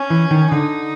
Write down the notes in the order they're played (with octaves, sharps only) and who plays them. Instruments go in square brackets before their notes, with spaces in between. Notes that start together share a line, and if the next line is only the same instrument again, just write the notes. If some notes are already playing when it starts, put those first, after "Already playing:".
Already playing: [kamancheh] C#4
[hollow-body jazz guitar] E3
D#3
[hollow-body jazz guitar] D3 [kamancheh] D#4